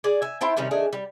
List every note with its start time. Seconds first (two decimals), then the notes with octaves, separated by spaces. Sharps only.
0.04 G#4 D5
0.22 E5 G#5
0.41 E4 C5 G5 A5
0.57 C3 D#3 G3 C#4
0.71 D#3 A3 D4 G#4
0.93 G3